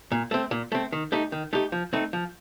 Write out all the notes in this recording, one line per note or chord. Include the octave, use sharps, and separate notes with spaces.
A#2
A3 C4
A#2
A3 C4
D#3
A3 D#4 G4
D#3
A3 D#4 G4
F3
A3 C4 D#4
F3